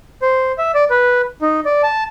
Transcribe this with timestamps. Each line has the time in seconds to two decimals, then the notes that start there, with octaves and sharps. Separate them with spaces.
0.22 C5
0.58 E5
0.74 D5
0.90 B4
1.42 D#4
1.65 D5
1.83 A5